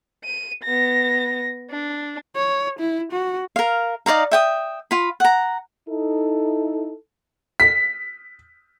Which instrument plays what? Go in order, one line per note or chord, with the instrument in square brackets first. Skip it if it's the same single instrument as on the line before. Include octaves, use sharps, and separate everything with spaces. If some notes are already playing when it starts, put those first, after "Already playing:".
[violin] D#7
B3 A#6
D4
[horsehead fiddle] C#5
E4
F#4
[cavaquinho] A#4 F5
D#4 D5 F5 A#5
E5 G5 D#6
F4 B5
F#5 A#5
[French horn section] D#4 E4 A4
[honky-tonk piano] B6